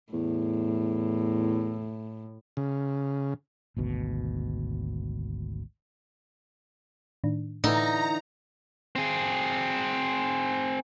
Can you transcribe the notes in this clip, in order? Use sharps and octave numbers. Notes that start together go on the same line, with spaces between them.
E2 A2
C#3
G#1 D2 B2
A2 D#3 D4
A2 D3 E3 D#4 A#5
C4 G#4